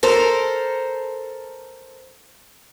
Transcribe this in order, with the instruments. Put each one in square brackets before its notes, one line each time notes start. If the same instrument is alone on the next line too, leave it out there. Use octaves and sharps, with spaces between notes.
[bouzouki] A4 A#4 C5